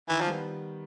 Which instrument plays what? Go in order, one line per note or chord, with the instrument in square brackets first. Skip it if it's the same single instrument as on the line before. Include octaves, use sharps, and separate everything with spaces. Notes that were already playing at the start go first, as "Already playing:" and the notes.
[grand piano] D#3 [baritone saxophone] E3
[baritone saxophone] F3
[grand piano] G3 B3